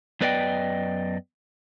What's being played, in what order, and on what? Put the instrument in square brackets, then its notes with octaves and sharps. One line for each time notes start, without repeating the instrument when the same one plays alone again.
[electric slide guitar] F#2 B3 B4 D5 D#5 G5